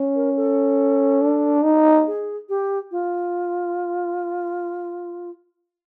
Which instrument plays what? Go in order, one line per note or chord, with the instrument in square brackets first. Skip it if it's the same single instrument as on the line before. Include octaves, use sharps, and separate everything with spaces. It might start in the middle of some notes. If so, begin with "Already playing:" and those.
Already playing: [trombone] C#4
[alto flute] A#4
A4
[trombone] D4
D#4
[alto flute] G#4
G4
F4